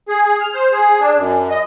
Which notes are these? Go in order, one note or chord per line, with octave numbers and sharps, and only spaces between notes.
G#4
G#4
F6
C5
G#4
D4
F#2
D#5